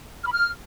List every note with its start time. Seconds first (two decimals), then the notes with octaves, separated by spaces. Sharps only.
0.22 F6
0.28 B5
0.33 F6